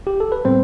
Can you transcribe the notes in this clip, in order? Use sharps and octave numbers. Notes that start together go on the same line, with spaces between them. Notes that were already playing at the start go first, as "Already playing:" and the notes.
G4
A4
B4
A2 G3 B3 C4 C5